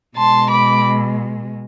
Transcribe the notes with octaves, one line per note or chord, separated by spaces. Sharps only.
B2 G#3 A5 C6
B5 D6